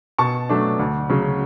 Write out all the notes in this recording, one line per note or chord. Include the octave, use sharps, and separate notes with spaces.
B2 A5 C#6
F#3 A3 D4
D2
C#3 F#3